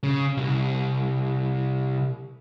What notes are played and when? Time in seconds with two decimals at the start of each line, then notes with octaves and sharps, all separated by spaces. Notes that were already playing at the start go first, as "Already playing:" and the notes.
0.03 C#3
0.37 C2